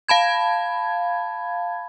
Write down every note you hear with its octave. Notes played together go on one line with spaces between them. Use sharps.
F5 A5 B5 G#6